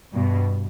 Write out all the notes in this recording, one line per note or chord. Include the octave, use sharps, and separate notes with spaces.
G2 B2